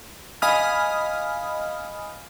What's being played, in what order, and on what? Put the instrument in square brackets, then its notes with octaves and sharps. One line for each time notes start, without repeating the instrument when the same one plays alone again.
[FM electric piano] D#5 F5 G#5 B5 D#6 F6